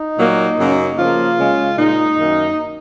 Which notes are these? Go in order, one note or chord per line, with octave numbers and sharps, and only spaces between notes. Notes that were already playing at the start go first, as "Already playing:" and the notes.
Already playing: D#4
A#2 F#3 A#3
F#2 C#3 F#3 A#3
C#3 F3 A#3 F4
C#3 G#3
A#2 G#3 D#4
F#2 D#3 A#3